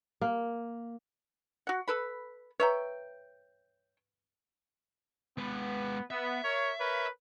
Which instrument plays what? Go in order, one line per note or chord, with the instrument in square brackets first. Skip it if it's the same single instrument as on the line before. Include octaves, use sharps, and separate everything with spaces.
[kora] A#3
[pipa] F#4 F#5
A4 B4 B5
[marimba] B4 A#5 [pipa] C#5 E5 G5
[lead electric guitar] G#3 B4 [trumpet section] B3
[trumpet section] B3 [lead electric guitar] E5
[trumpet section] A#4 C#5
A#4 B4 C#5